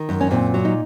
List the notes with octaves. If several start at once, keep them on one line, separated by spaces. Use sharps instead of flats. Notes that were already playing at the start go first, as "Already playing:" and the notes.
Already playing: D#3
F#2
C#4
A#2 C4
F#3
D#4